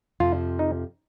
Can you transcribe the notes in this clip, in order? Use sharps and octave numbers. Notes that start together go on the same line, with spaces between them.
F2 C3 F3 F4
D#4